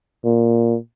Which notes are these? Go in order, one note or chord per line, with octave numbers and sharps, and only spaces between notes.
A#2